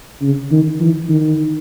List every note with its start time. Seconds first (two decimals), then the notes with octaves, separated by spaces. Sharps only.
0.22 C#3
0.51 D#3
0.80 E3
1.09 D#3